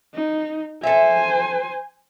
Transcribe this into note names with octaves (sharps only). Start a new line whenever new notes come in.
D#4
A4 C5 E5 G#5